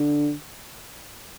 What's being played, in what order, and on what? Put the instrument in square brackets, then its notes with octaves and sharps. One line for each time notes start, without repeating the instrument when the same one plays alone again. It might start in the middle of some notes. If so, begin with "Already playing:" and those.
Already playing: [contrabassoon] D3